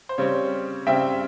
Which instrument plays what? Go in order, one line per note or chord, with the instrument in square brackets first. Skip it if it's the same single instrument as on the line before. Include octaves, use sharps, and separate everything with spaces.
[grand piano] C5
C#3 G3 C4 C#5
C#3 G3 C4 E5 G5